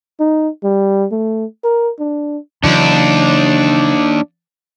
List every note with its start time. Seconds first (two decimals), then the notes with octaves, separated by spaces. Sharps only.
0.20 D#4
0.64 G3
1.12 A3
1.64 A#4
2.00 D4
2.64 D#2 C#3 E3 F#3 D4